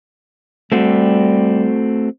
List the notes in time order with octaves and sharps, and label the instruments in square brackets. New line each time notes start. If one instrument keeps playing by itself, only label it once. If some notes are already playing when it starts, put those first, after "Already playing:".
[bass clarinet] G3 [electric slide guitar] A3 C4 F#4